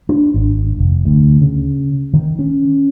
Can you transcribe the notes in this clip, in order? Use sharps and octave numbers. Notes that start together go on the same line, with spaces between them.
D4
G#1
F1
D2
C#3
D#3
C#4